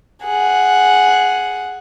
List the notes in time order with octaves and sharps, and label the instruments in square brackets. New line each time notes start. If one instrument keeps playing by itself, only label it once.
[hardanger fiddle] G#4 F#5